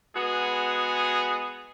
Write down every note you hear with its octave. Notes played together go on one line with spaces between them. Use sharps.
G#3 B3 F#4 G#4